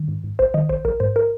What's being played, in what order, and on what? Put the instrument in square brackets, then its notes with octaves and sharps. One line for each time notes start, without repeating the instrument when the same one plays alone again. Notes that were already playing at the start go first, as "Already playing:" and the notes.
Already playing: [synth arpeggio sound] D#3
G#2
G#2
A#1 C5
D#3 D#5
A#1 C5
A#1 A#4
G#2 C5
A#4